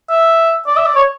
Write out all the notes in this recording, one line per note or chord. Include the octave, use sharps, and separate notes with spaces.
E5
D5
E5
D5
C#5